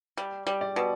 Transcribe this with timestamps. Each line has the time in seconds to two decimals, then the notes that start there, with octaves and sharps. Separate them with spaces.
0.18 G3
0.47 G3
0.61 D5
0.76 B2